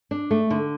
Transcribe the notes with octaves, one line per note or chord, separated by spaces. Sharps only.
D4
A3
D3